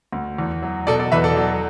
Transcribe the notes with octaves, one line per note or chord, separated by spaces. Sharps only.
D2
E2
F#3
B2 A4 D5
A4 D5
E2 B4 E5
A4 D5
F#3